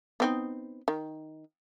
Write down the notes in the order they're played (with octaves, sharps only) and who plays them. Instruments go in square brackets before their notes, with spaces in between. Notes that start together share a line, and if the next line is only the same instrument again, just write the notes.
[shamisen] B3 C4 D#4
D#3